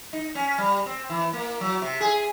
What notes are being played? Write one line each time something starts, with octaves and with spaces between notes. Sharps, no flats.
D#4
C#4
G3
C4
E3
A#3
F#3
C3
G#4